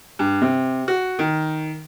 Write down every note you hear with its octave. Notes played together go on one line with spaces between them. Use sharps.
G2
C3
F#4
D#3